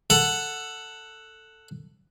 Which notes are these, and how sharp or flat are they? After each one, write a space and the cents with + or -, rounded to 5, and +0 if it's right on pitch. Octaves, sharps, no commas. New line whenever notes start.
A4 +10 F#5 +0